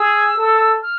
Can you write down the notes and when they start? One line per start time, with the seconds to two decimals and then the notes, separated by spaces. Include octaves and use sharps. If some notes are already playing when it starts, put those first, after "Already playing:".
Already playing: G#4 E6
0.37 A4
0.82 F6